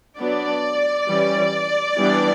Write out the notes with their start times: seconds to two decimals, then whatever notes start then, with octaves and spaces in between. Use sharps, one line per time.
0.17 F#3 B3 D4 D5
1.08 E3 G3 C#4
1.97 E3 G3 B3 D4